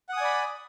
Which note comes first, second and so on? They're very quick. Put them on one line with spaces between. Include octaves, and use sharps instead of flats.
F#5 D#6 G#5 D5 B5